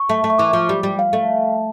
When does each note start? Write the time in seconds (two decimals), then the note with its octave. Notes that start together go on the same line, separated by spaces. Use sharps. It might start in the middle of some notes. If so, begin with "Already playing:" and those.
Already playing: C#6
0.09 A3
0.24 A3
0.30 C#6
0.38 E3 D6
0.53 F3
0.69 G3
0.83 G3
0.99 F5
1.13 A3